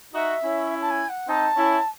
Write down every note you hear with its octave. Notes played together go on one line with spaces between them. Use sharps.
D#4 F#4 E5
C#4 E4
A5
G#5
F#5
C4 D#4 A5
C#4 E4